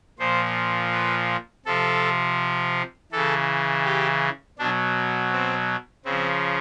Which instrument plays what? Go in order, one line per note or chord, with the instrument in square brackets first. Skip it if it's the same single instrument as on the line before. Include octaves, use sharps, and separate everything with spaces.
[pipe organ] A#2 F3 C5
B4
C3 F3 A4
C#3 E3 A4
G4
B2 F#3 D4
C4
C#3 F3 C4